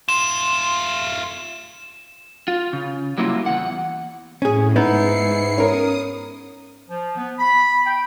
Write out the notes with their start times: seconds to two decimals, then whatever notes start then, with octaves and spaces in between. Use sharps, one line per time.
0.09 A3 F4 E7
2.48 F4
2.73 C#3
3.18 F#3 G3 A#3 E4 F4
3.46 E2 F#5
4.42 A2 C#4 G#4
4.76 G#2 B3 D#4 E4 C7 C#7
5.58 C#4 A#4 D#6
6.89 F3
7.17 B3
7.39 B5
7.85 G5